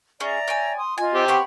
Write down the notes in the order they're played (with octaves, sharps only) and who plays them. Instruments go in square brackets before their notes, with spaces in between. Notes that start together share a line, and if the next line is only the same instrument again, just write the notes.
[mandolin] C#4 G#4 [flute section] D5 E5 A#5
[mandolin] C#5 G5 G#5
[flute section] C6 D#6
[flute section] F4 D#5 [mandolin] G#5
[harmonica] C4 G4
[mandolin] B3 C#5 C6 [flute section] E5 G5 B5